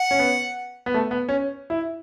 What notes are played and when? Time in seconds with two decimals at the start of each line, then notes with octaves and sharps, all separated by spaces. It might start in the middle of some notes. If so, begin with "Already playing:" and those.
Already playing: F#5
0.11 C#4
0.19 B3
0.86 B3
0.94 A3
1.11 B3
1.29 C#4
1.70 E4